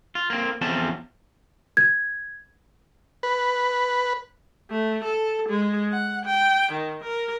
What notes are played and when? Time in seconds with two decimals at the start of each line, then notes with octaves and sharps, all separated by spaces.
0.15 F4
0.30 A#3 C4
0.61 E2 F3 C4 C#4 A5
1.77 G#6
3.23 B4
4.71 A3
5.04 A4
5.49 G#3
5.91 F#5
6.26 G5
6.72 D#3
7.04 A#4